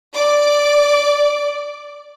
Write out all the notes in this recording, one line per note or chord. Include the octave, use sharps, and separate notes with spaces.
D5 D6